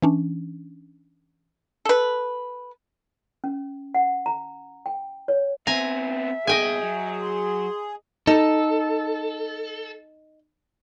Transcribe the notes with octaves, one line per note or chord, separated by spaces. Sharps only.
E3 C#4 D4
A4 B4
C#4
F#5
A#5
G5
C#5
B3 C4 E5 G#5 A#5
C#2 B2 G#4 D#5 G5 G#5
F#3
C6
D#4 A4